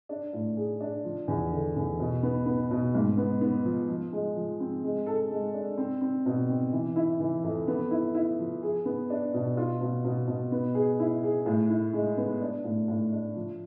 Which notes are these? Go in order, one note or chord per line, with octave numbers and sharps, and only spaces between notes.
D4
A2
G#4
D4
F3
E2
D3
E2
B2
B3
B3
B2
G#2
B3
B3
F3
F3
G#3
F3
C4
G#3
A4
G#3
D4
C4
C4
B2
C4
E3
E4
E3
F2
B3
E4
E4
F3
G#4
B3
D4
B2
F4
B2
B2
B2
B3
G#4
E4
G#4
A2
E4
G#3
B3
D4
A2
A2
D4
F3